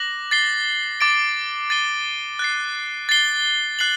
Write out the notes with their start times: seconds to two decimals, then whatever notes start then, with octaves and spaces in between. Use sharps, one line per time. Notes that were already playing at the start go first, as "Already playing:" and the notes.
Already playing: D6 F#6 A#6 F#7
0.31 A6 C7 G7
1.01 D6 A6 D7
1.70 A6 C7 D#7 G7
2.39 F#6 A6 C7
3.09 A6 C7 G7
3.79 F#6 C7 F#7